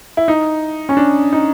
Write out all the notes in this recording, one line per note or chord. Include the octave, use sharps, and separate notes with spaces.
E4
D#4
C#4
D4
D#4